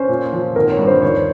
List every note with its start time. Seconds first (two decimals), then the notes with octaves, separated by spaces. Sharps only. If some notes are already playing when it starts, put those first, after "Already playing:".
Already playing: C#4 C5
0.09 A#2
0.33 F3
0.56 G#1 A#4
0.72 C#5
0.79 G2
0.87 C5
1.02 D#2 C#5